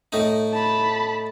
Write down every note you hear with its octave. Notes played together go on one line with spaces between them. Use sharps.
A2 D#4
A5 B5